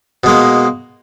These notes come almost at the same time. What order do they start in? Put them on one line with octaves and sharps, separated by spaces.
B2 G#3 A#3